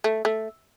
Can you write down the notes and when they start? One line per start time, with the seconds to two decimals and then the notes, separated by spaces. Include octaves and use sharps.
0.04 A3
0.25 A3